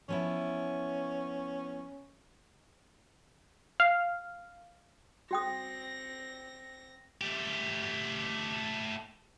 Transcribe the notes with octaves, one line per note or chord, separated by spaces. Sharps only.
F3 B3 C#4 E4
F5
C4 F#4 G5 D#6 A#6
A3 G4